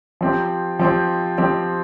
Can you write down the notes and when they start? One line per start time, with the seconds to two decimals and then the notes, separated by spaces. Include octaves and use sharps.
0.21 F3 C4 G4
0.79 F3 C4 G4
1.38 F3 C4 G4